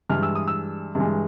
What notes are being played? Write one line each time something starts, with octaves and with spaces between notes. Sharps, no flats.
G2 E3 G#3 F6
E6
D#6
E6
G2 E3 G#3